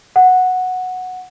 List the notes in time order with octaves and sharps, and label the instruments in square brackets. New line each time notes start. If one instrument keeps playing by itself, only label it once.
[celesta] F#5